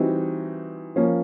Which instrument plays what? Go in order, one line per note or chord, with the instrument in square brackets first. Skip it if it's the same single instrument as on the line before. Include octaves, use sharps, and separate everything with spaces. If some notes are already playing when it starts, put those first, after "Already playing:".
Already playing: [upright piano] E3 G3 C4 D#4 F#4
F3 A#3 C#4